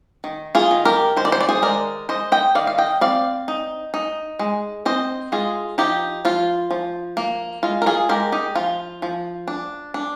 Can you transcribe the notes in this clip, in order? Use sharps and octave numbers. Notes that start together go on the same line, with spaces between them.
D#3
F4 G#4
D#3
G4 A#4
D#3 C5
D5
C5
D5
G#4 C5
G#3 A#4 D5
G#3 C5 D#5
D#5 G5
D#3 D5 F5
F5
D#5 G5
C4 D5 F5
D#4
D#4
G#3
C4 C5 D#5
G#3 F4 G#4
F3 D#4 G4
F3 F4
F3
A#3
G#3 F4
A#4
F4 G#4
G#3 G4 A#4
D#4 G4
F3 F4
F3
D4
D4